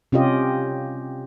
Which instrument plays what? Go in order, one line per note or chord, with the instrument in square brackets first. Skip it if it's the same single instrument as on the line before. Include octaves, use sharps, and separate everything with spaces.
[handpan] C3 C#4 F4 G4 D#5